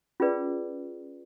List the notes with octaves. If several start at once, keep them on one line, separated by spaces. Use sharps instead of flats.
C#4 F4 G#4 B4 D5